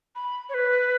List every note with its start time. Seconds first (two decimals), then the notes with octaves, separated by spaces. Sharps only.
0.15 B5
0.49 C#5
0.54 B4